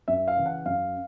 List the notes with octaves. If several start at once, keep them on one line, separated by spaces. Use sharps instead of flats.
F#2 E5
F5
C#3 E3
F#5
F#2 F5